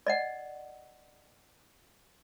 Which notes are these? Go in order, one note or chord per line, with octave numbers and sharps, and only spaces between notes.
D5 D#5 F#5